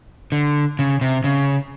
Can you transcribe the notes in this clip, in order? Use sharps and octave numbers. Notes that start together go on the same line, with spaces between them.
D3
C#3
C3
C#3